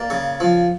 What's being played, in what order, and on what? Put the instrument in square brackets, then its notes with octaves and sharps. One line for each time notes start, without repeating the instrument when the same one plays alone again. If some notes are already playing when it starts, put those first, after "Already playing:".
Already playing: [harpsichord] A#3 D5
C#3
F3